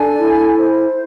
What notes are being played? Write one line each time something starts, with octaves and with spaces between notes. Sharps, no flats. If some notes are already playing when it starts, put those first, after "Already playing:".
Already playing: D4 A4 G#5
E4
C5